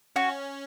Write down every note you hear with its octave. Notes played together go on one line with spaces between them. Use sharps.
C#4 F#4